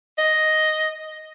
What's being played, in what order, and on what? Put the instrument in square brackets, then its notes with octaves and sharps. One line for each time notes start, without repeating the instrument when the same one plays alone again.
[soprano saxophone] D#5